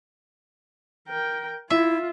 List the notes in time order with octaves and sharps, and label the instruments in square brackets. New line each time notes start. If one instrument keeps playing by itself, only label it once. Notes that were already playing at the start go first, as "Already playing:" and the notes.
[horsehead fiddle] A#4 G5
[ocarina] E4 [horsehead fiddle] F4 [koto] E5